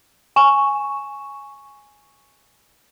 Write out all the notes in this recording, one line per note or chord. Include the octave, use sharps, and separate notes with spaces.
G#5 C#6 E7